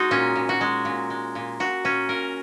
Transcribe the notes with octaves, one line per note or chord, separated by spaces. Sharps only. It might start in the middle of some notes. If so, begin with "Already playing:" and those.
Already playing: G#3 D#4 F#4
A#2 C#4
A#2
F#4
G#3
A#2
G#3
A#2
A#2 F#4
A#2 C#4
A#2 A#4